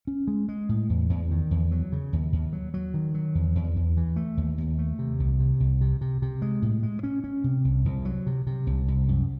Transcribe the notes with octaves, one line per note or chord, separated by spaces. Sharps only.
C#4
G#3
G#3
A2
E2
E2
D#3
E2
F#3
C#3
D#2
D#2
F#3
F#3
D#3
F#3
E2
E2
E2
E3
A3
D#2
D#2
A3
C3
C2
C3
C2
C3
C3
C3
G#3
A2
G#3
C#4
C#4
C3
C2
C2
F#3
C3
C3
C2
C2
F#2